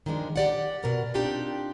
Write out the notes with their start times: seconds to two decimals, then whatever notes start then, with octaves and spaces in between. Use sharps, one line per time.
0.06 D#3 F3 G#3 D4
0.36 G4 D5 F#5
0.83 B2 A#4 F#5
1.14 C4 D4 D#4 F4 G4 D5